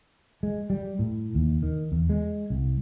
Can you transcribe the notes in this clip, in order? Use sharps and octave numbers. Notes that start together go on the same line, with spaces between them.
G#3
G3
A2
D#2
D#3
E2
G#3
C2